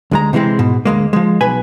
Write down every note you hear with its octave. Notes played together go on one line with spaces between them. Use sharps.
D2 G#3 A#5
C3 E3 G3 G#3 C4
G#2 B2
D2 G#3 A#3
F3 G#3
B1 B4 G#5